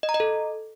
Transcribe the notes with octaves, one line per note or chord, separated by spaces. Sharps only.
D#5
A#5
D#5
A4